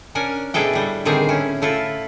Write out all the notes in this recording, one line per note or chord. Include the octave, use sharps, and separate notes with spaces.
C#4 D4 A#4 G#5
B2 D4 E4 G#4 A4 G5
A2 G3
A2 D3 D#3 G3 C4 G#4
C#4 E4
A3 E4 F4 A4